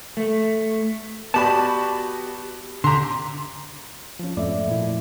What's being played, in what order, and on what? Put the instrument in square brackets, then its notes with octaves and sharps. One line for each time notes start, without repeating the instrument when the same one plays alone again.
[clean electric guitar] A3
[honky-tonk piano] B3 D5 B5 [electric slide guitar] F#4 G4 A5
[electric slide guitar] D3 G4 [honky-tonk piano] A#5 C6
[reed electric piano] F3 C#4
[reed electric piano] F2 G#2 D5 [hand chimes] A3 E5
[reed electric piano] A#2 F3 E4